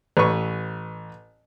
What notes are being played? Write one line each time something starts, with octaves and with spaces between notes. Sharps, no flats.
A1 B4 C#6